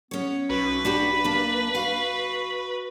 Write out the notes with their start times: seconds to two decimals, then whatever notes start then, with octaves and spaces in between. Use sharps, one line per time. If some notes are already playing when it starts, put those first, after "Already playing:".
0.11 B3 C#4 C#5
0.50 B1 F#4 B4
0.85 D4 F#4 G4 B5
1.24 A#3 D4
1.75 F#4 F5